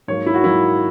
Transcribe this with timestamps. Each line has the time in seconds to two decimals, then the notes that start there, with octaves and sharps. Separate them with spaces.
0.08 G#2 F#3 A#3 C#5
0.26 E4
0.34 F#4
0.44 G#2 F#3 A#3 E4